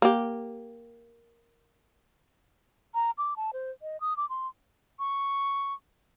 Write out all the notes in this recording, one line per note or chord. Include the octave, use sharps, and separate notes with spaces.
A#3 G4
A#5
D6
A5
C5
D#5
D#6
D6
C6
C#6